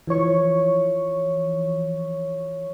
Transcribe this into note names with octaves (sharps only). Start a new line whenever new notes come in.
E3 F3 C#5 C#6